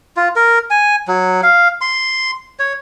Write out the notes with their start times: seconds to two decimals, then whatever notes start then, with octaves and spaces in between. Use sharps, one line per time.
0.17 F4
0.36 A#4
0.70 G#5
1.08 F#3
1.43 F5
1.81 C6
2.59 C#5